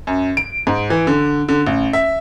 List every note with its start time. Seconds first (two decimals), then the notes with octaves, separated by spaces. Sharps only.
0.07 F#2
0.37 D7
0.67 G#2
0.90 E3
1.07 D3
1.49 D3
1.67 A1
1.93 E5